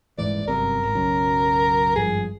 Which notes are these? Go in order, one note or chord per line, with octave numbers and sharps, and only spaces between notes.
D#1 G#2 E3 D5
G1 F#2 C3 A#4
G#1
B1 F#2 C#3
G#1 G2 F3 G#4